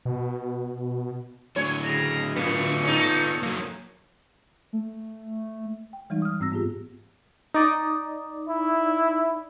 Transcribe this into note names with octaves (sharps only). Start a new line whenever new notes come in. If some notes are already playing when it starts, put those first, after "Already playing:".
B2
A2 D3 F#3 C#5 G#5
C#3 A#5
F#2 B3 F4 C#6
C#4 D#4 A4
F#3 A#3
A3
G5
E3 G3 G#3 D#4
D#6 F6
G#2 C4 E6 A#6
B3 F4 G4 G#4
D#4 D5 D#5
E4